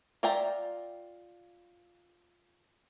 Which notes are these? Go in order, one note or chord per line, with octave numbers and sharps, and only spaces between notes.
F4 D5 E5 G5 A#5